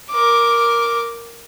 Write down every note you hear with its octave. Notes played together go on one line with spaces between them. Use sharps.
A#4 D6